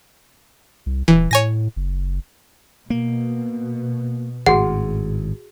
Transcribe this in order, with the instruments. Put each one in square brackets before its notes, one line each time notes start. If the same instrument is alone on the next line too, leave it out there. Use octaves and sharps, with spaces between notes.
[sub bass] C2
[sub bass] D#1 [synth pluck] E3
[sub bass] A2 [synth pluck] C#5 G#5 A#6
[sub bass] F#1
[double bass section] B2 [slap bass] A#3
[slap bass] G#1 A2 [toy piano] F#4 G#4 [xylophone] F#5